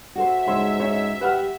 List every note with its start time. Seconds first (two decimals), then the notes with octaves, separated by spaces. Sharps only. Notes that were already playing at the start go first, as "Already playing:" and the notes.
0.16 F#4 A4 C5 E5
0.48 G#2 C#3 C#5 C6
0.80 C#4 D#4 C#5
1.21 G4 B4 F#5 F6